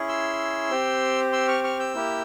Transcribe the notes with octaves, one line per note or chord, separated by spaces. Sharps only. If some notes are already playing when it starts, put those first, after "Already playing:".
Already playing: C#4 E4 G#4
C6 E6
C4 G4
C6 E6
C#6 F6
C#6 F6
E6 G6
A#3 E4 G4